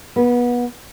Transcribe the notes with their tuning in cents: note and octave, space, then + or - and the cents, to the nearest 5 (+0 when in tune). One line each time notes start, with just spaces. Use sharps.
B3 -25